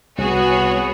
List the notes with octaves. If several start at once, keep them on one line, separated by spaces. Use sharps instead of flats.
C2 B3 F#4 G#4 C#5